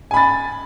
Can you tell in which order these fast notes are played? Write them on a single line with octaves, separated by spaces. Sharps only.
G#5 B5 A6